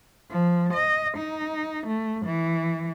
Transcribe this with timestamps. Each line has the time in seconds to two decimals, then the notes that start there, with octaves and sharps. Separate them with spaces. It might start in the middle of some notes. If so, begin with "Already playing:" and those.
0.31 F3
0.74 D#5
1.18 D#4
1.87 A3
2.26 E3